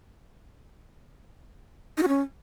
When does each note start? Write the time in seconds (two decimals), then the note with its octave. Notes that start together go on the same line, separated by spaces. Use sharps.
1.97 D#4
2.03 F#4
2.08 C#4